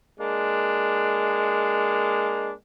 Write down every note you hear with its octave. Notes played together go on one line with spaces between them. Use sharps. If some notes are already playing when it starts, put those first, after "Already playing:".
G#3 A#3 D4